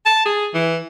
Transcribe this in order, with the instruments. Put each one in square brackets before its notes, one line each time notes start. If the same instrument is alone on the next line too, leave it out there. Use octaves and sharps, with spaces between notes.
[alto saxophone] A5
G#4
E3